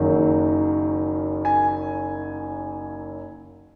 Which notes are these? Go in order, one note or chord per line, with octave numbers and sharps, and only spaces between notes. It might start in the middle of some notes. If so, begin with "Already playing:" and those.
Already playing: F#1 F#2 D#3 F#3
G#5